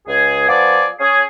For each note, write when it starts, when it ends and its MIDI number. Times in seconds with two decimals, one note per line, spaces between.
0.08 0.47 37
0.08 0.47 68
0.48 0.87 53
0.48 0.87 59
0.48 0.87 65
0.48 0.87 68
0.48 0.87 74
1.00 1.23 61
1.00 1.23 68